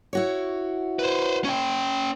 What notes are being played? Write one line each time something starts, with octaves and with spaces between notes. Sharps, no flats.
E4 F#4 C#5
B4 C5
C#4 G5